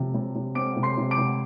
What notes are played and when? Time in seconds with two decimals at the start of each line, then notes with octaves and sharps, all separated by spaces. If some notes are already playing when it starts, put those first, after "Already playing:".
Already playing: C3 F3
0.14 C3
0.35 C3
0.55 C4 D6 D7
0.76 C3
0.83 C6 C7
0.97 C3
1.11 D6 D7
1.18 C3